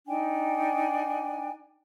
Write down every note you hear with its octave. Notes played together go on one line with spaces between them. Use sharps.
D4 D#4 G5 G#5